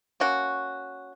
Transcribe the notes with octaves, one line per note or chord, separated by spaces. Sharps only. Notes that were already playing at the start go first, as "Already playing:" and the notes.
A#3 C#4 F#4